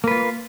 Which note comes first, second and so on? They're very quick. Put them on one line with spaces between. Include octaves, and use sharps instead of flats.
A#3 B4 F4